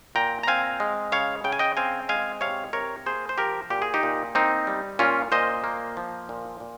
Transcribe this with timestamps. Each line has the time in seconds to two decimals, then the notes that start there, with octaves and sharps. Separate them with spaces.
0.15 A#2 G5 A#5
0.43 A#5
0.47 C4 F5 G#5
0.80 G#3
1.12 C#3 C#5 F5
1.44 C#3 G5
1.52 G#5
1.59 D#5 G5
1.77 C4 F5 G#5
2.09 G#3 F5 G#5
2.41 C3 C#5 F5
2.73 C3 A#4 C#5
3.06 A#3 G#4 C5
3.29 C5
3.38 F3 G4 A#4
3.70 A#2 G4
3.82 G#4
3.94 D#4 G4
4.03 A#2
4.35 A#3 C4 D#4
4.67 G3
4.99 A#2 C#4 F4
5.32 A#2 C5 D#5
5.64 A#3
5.97 F3
6.29 A#2
6.60 A#2